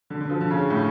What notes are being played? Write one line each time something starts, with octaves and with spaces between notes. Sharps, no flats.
D3
D3
F3
D3
C#3
A2